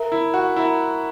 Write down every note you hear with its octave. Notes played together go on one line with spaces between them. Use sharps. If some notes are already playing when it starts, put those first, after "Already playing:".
Already playing: A#4 E5 A#5
E4
F#4
E4 A#4 E5 A#5